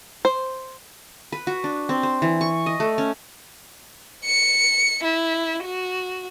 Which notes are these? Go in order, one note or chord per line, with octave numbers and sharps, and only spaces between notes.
C5
B4
F#4
D4
C4
C5
E3
C#6
D#5
A3
C#4
C#7
E4
F#4